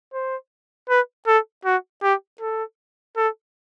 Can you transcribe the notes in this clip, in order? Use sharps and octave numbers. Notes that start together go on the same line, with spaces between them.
C5
B4
A4
F#4
G4
A4
A4